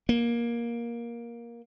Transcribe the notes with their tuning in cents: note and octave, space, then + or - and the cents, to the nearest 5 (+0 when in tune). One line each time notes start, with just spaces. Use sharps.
A#3 +15